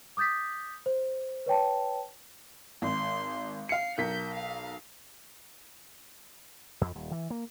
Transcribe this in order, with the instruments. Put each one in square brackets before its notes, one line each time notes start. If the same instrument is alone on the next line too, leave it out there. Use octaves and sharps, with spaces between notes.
[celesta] D6 D#6 G6 A6 B6
C5
B4 C#5 G5 A5
[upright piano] G#1 [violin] C6
[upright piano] F5 C#7 [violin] C7
[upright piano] B1 A#4 B6 [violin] G6
[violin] F5
[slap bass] F2
D#1
E3
A#3